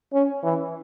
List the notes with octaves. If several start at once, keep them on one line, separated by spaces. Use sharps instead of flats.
C#4
E3